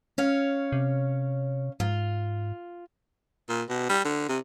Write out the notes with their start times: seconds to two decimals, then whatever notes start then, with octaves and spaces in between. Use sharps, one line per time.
0.18 C#4 C#5 F5
0.72 C3
1.80 G#2 F4
3.49 A#2
3.69 B2
3.89 G3
4.05 D3
4.29 C3